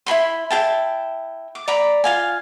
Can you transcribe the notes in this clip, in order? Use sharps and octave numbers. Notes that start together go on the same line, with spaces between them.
E4 G#4 B5 C6
E4 G#4 G5 A5
D6
D5 A#5 B5
F4 F5 G#5